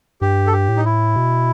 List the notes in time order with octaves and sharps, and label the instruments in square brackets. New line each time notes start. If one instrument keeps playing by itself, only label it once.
[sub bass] G2 [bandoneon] G4
[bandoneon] A4
G4
[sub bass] A2
[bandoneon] D#4
E4
[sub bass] B2